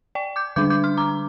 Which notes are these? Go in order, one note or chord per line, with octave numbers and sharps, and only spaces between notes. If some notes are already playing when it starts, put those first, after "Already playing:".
D5 G5
D6 G6
D3 G3 D4 D6 G6
D6 G6
C6 F6
A#5 D6